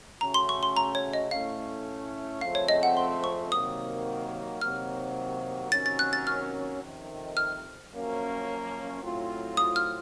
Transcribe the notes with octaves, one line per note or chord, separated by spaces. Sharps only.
C#3 A3 C#4 F#4 A#5
C6
C#6
C6
A#5
C#5
D#5
A2 A3 C#4 F5
F2 C#3 A3 C4 F5
C#5
D#5
F#5
C6
C#6
C3 D#3 F#3 A#3 D#6
C3 D#3 F#3 A#3 F6
C3 D#3 F#3 A#3 C#4 A6
A6
F#6
A6
F6
F2 C3 D#3
F6
F#2 F3 A#3 C#4
A2 F#3 C4 F4
D#6
F6